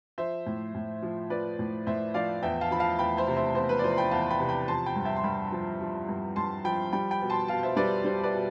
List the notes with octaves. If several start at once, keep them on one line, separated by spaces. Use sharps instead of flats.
F3 C5 E5
A2
A2
F3
F3 B4 D5
A2
A2 C5 E5
F3 D5 F5
E2 E5 G5
F5 A5
F3 B5
F5 A5
E2 G5 B5
C5 E5
C3
C5 E5
E2 C5
B4
D5
F3 C5
C6
G5 B5
E2 F5 A5
G5 B5
C3
G5 B5
F3 A5 C6
G5 B5
G2
E5 G5
C6
G2 G5 B5
F3
F3
G2
G2 A5 C6
F3 G5 B5
G3 G5 B5
G5 B5
B2
A5 C6
B2 F5 A5
C5 E5
G3 B4 D5
G3 C5
B4 D5
B2